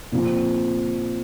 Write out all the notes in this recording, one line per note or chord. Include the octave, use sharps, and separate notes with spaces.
A#2 F3 C4 F4